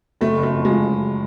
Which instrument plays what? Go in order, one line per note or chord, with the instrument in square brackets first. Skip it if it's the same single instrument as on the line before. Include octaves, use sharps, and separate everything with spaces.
[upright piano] F#1 A3
F#1
A3
F2
F3 G#3
F#1